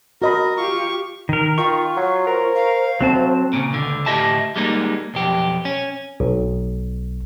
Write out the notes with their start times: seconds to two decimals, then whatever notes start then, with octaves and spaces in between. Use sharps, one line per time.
0.22 F#4 A#4 D#5 B5
0.57 F4 G4 C#6
1.29 D#3 A#4
1.58 D#3 F4 C#6
1.96 F#3
2.27 A#4 C5
2.55 F5
3.01 D2 F#3 C4 A5
3.53 A#2 C#3
3.74 C#2 D3
4.06 D2 A2 G4 D#5 E5 A5
4.56 G3 G#3 A#3 C#4 D#4
5.14 B1 F2 G4
5.65 C#4
6.20 B1